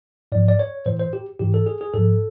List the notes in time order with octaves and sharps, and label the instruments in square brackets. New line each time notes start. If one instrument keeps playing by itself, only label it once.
[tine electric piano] G#2 F3 D5
D5
C#5
A2 E3 C5
C5
G4
G#2 E3 G4
A4
G#4
G#4
G#2 F3 A4